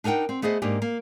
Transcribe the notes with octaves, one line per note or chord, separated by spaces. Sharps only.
D4 D#4 A#4 F#5 G5
C4
A3 B3 G#4 C5 D#5
G#2 A#3 D4 D#4 G4
A#3